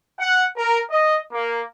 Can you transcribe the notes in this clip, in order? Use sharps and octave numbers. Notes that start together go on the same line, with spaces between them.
F#5
A#4
D#5
A#3